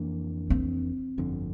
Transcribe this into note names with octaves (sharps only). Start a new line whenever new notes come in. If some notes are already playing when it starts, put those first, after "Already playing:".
Already playing: F2 E3 A#3 D4
C4
G1 F2 D3